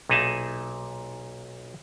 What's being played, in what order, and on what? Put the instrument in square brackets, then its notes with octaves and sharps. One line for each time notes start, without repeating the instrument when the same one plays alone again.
[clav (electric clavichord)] B1 A#2 D#4 G#4 E5 A5